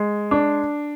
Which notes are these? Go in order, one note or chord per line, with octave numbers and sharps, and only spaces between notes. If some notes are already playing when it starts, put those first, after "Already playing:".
Already playing: G#3
D4